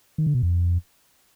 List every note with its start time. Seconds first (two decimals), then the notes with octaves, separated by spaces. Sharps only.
0.18 D#3
0.26 D3
0.35 B2
0.43 F2